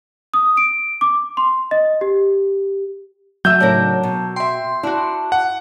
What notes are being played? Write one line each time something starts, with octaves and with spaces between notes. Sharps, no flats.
D#6
D7
D6
C6
D#5
G4
F#3 A3 E5 E6 G6
A2 C#3 D4 D#4 A#4
B2
E5 G5 C6
D4 E4 F#4
F#5